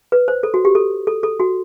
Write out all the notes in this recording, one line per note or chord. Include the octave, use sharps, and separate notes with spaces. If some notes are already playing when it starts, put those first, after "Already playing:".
B4
C5
A4
F#4
G4
A4
A4
A4
F#4